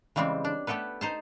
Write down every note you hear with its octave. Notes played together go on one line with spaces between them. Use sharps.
C#3 E3 G3 G#3 C4
D4
A3 B3 G4 A4 B4
D#4 C5 A5